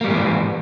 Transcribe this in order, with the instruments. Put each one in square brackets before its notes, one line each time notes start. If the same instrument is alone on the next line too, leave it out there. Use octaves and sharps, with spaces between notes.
[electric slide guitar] A#3
G3
G#2
D#3
E3